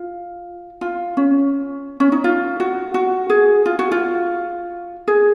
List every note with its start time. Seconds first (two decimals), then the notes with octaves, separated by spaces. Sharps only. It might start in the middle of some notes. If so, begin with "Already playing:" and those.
Already playing: F4
0.81 F4
1.17 C#4
2.00 C#4
2.12 D#4
2.24 F4
2.60 F#4
2.94 F#4
3.30 G#4
3.66 F4
3.79 F#4
3.92 F4
5.08 G#4